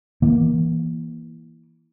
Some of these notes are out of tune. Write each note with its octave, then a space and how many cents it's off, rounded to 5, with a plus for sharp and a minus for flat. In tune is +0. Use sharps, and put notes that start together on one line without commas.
E3 +0 A#3 +20